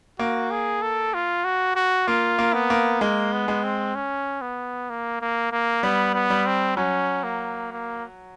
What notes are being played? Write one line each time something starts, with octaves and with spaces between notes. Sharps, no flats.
A#3 F#4
G#4
A4
F4
F#4
F#4
A#3 F4
A#3
B3
A#3
G#3 A#3
B3
G#3
C4
C#4
B3
A#3
A#3
A#3
G3 B3
B3
G3
C4
F#3 C#4
A#3
A#3